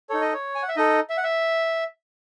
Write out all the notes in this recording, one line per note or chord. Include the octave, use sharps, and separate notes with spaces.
D#4 A4 C#5
D#5
C#5
G#5
F#5
E5
D#4 A4 D#5
E5
F#5
E5